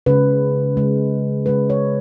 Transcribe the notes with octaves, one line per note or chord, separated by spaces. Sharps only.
C#3 G#3 B4
C#3 G#3
C#3 G#3 B4
C#5